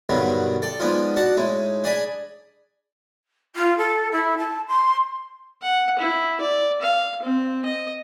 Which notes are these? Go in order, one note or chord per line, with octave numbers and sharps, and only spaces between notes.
G2 B2 D3 D#3 F#3 G3
A4 D5 G5 A5
F3 G#3 B3 D4 D#4 F4
D4 F#4 F#5 A5 D6
A2 G#3 D#4
D4 G#4 D5 D#5 G#5 B5
F4
A4
E4
A5
C6
F#5
E4
D5
F5
C4
D#5